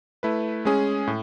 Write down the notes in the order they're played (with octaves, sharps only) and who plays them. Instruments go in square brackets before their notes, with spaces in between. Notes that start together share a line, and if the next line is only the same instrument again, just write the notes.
[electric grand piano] A3 E4 B4
G#3 C#4 G#4
A2